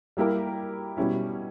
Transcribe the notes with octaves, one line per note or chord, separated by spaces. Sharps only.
G3 A#3 E4 G4 A#4
B2 G3 C#4 E4